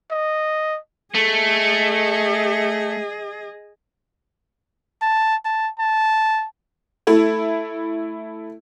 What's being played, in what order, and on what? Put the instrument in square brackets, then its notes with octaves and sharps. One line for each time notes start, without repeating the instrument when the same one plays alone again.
[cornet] D#5
[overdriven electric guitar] A3 [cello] G#4 D#5
[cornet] A5
A5
A5
[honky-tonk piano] A3 E4